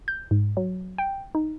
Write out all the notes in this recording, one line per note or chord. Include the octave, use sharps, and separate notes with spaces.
G6
G#2
F#3
G5
D#4